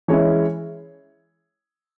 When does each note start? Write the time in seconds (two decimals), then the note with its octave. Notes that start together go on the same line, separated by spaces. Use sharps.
0.08 E3 G#3 C#4 E4 C#5